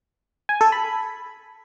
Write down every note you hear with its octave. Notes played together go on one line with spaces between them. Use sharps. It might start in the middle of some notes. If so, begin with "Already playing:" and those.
G#5
A4
B5